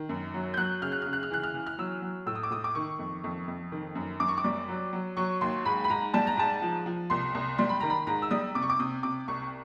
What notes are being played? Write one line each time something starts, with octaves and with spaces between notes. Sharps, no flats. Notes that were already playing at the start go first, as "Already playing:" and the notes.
Already playing: D#3
F#2
F#3
G6
F#3 F#6
C#3 F6
F#6
C#3 F6
F#6
F6
E3 F#6
F6
E3
F6
F#3 E6
F#3
A2 E6
D#6
D6
A2 D#6
D6
D#3 C#6
F2
F2
F2
D#3
F#2
F#2 D6
C#6
D6
G3
F#3
F#3
F#3 C#6
D#2 C6
G#2 B5
B5
G#2 A#5
G3 A5
A#5
G#2 A5
F3
F3
C2 C6
C2
G3 C6
B5
D#3 A#5
B5
G#2 A#5
E6
G3 D#6
C3 D6
C#6
D6
C3 D#6
C3 D6
C2 C#6